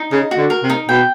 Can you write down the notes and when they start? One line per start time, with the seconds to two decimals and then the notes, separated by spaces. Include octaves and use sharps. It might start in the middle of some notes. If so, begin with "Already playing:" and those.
Already playing: D#4
0.11 C#3 D#5
0.31 F#4
0.37 D3
0.50 A#4
0.63 C3
0.70 D#4
0.89 B2 G5